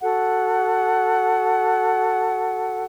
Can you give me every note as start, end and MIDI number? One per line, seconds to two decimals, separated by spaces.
0.01 2.83 66
0.01 2.83 69
0.01 2.83 78